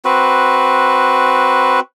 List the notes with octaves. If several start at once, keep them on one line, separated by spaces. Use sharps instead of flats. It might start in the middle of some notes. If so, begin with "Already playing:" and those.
C4 F#4 B4